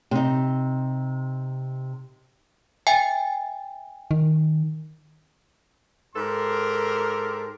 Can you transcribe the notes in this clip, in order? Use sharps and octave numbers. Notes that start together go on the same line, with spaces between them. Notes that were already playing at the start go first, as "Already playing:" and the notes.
C3 D#4
E5 G5 G#5
D#3
G#2 G4 A4 A#4 C6